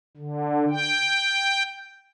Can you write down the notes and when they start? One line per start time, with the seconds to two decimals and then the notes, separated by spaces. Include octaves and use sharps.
0.17 D3
0.70 G5